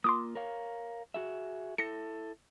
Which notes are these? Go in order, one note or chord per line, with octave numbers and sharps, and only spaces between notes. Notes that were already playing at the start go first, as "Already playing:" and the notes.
A#3 F4 C6 D6 D#6
A#4 C#5 F5
F#4 G#4 E5
E4 A4 A#6 C#7